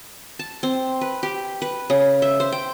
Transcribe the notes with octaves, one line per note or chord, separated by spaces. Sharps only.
A5
C4
B4
G4
B4
C#3
E5
C5
G5